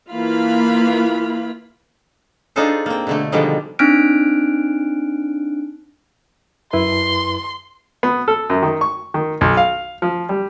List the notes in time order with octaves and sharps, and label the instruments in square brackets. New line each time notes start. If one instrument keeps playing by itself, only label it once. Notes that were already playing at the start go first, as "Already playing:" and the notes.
[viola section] E3 A#3 F4 F5 B5
[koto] D4 D#4 F4 G#4 A4 C5
A#3 C4
B2 D3 A3
B2 D3 D#3 F3 G3 G#3
[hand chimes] C4 D4 D#4 F6 F#6 D7
[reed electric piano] F#2 E4 B4 [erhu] C6
[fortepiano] B3
A4
F#2
D#3
C#6
D#3
B1
F5
F3
G3